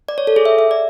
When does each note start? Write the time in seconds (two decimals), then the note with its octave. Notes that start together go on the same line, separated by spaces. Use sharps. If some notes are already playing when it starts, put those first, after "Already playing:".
0.09 D5
0.18 C#5
0.27 A4
0.36 G#4
0.46 E5
0.59 E5
0.71 D5